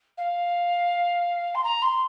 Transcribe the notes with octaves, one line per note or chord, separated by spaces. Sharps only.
F5
C6
A#5
C6